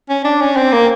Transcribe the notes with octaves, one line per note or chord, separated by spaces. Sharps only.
C#4
D4
C#4
C4
A#3